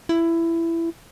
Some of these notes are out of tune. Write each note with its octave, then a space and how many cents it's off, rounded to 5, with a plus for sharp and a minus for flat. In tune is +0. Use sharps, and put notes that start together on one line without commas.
E4 +15